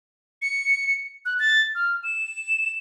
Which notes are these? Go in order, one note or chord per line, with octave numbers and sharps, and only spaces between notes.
C#7
F#6
A6
F6
E7